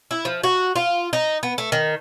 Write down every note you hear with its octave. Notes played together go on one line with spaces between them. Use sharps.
E4
F3
F#4
F4
D#4
B3
A3
D#3